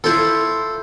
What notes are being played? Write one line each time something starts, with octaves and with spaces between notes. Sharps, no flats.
E4 F4 A4 C5 C6